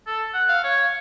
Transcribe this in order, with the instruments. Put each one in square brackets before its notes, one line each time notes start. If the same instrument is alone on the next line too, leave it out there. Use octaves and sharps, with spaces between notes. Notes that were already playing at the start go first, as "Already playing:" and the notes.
[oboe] A4
F#5
F5
C#5